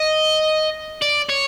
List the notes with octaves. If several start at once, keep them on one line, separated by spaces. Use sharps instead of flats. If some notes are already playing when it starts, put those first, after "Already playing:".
Already playing: D#5
D5
C#5